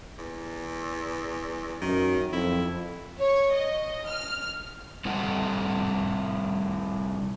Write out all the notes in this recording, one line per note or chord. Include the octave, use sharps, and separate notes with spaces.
E2
F#2 D#3
F2 E4
C#5
D#5
F6
C3 G3 F4 A4 D#5 F#5